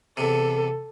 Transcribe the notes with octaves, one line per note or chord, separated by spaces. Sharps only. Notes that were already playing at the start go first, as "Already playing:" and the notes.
E2 C3 A4